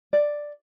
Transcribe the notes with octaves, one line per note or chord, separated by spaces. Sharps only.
D5